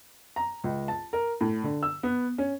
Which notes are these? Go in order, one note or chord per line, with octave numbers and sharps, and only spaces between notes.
A#5
C#2
A5
A#4
A2
D3
E6
B3
C#4